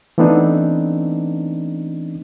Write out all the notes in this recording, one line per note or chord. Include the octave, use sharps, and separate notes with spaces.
E3 A3 B3 C4 D4 D#4